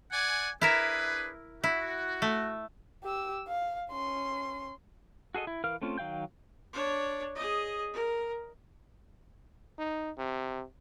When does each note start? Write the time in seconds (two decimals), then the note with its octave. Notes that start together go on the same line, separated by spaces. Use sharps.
0.12 D5 F#5 G#5
0.61 D4 E4 G#4 A#4 B4 E5
1.64 E4 F#4
2.22 A3
3.04 G4 E6
3.48 F5
3.91 C#4 C6
5.35 F#4 G#4 A4 D#5
5.47 E4
5.64 E3 A#4 F5 F6
5.82 A3 C4 C#4 F4
5.98 D#3 F#3 F5 G5 G6
6.73 D4 C#5
7.35 G#4 D#5
7.93 A#4
9.79 D#4
10.17 C3